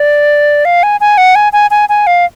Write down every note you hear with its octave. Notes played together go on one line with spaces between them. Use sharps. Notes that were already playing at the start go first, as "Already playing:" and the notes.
Already playing: D5
F5
G#5
G#5
F#5
G#5
G#5
G#5
G#5
F5